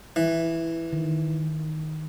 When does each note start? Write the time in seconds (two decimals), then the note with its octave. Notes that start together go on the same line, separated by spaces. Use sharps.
0.16 E3
0.93 D#3